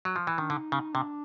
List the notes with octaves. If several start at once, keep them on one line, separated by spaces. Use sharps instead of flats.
F#3
F3
E3
D#3 D4
D3 D#4
C#3
C3 D4